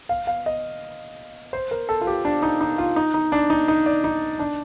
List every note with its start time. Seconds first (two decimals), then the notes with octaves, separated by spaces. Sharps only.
0.09 F5
0.27 F5
0.46 D#5
1.53 C5
1.71 A#4
1.89 A4
2.01 F4
2.07 G4
2.25 D4
2.42 D#4
2.61 D#4
2.78 F4
2.96 D#4
3.14 D#4
3.32 D4
3.50 D#4
3.68 D#4
3.86 D5
4.04 D#4
4.39 D4